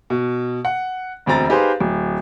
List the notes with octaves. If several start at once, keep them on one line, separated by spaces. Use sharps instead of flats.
B2
F#5
E1 D2 C4 A#5 A6
D#4 G4 G#4 B4 C5 F5
D1